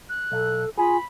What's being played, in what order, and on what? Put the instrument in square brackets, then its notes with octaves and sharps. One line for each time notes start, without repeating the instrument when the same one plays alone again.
[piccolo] F#6
[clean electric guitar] B1 [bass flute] A4
[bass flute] F4 [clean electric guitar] G#4 [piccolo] B5